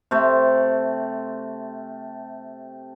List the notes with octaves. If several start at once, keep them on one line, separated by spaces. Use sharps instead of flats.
C3 A3